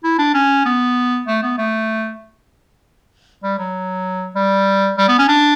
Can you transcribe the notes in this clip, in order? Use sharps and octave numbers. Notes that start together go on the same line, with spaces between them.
E4
D4
C#4
B3
A3
B3
A3
G3
F#3
G3
G3
B3
C#4
D4